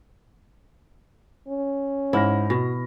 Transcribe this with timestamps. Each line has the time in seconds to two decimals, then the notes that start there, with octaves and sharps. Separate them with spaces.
1.48 C#4
2.13 G#2 E4 F6 A#6
2.50 B2 F#4 A#6